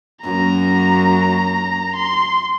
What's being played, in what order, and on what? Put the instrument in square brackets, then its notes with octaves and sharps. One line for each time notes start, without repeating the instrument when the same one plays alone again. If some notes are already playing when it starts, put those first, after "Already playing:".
[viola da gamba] F#2 A#3 [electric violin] A#5
[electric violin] C6